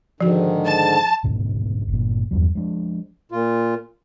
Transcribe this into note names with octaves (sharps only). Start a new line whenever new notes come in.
G#2 D3 D#3 F3 F#4
A5
D2 G#2 B2
G1 A#2
E2 G2 F#3
F3 G#3 A3 D4
A#2 F4